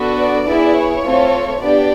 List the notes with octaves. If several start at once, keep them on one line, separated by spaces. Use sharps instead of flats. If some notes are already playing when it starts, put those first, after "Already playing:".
Already playing: B3 D4 F#4 A4
D5
B3 E4 G#4
C#5
A3 C4 F4 A4
B3 D4 G4 D5